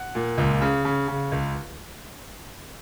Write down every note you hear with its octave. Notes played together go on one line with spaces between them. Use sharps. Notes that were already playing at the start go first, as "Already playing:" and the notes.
Already playing: F#5
A#2
C#2
C#3
C#3
C#3
C#2